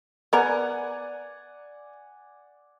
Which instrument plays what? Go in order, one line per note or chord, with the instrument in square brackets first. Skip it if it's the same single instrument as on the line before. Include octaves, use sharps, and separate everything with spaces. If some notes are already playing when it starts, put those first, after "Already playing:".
[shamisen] B3 A#4 [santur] D5 F#5 G#5